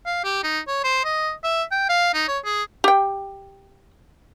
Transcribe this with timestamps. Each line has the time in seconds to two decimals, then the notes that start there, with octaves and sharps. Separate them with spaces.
0.06 F5
0.24 G4
0.44 D#4
0.67 C#5
0.84 C5
1.04 D#5
1.44 E5
1.72 G5
1.89 F5
2.14 D#4
2.28 C#5
2.45 G#4
2.84 G4 G5